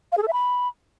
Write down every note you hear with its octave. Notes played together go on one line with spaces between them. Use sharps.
F5
G#4
A4
E5
B5